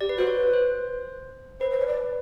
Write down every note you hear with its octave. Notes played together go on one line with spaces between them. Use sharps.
G4 D5
B4
F#4 C5
C#5
B4
C5
B4 C5
C5
C#5
D5